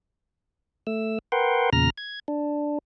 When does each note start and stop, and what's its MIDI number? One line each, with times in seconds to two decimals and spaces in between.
0.87 1.19 57
0.87 1.19 88
1.32 1.70 70
1.32 1.70 71
1.32 1.70 78
1.32 1.70 79
1.32 1.70 84
1.73 1.90 40
1.73 1.90 46
1.73 1.90 49
1.73 1.90 82
1.73 1.90 89
1.73 1.90 94
1.98 2.20 92
2.28 2.78 62